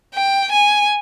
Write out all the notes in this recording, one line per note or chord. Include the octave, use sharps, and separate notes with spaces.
G5
G#5